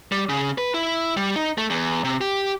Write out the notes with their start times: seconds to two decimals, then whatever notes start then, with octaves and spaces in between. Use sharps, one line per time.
0.12 G3
0.29 C#3
0.58 B4
0.74 E4
1.17 G3
1.36 D#4
1.58 A3
1.70 E2
2.04 C3
2.21 G4